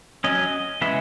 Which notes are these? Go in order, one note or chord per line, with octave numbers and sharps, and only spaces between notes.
F#3 C#4 D#5
C#3 E3 G#3 B3 E5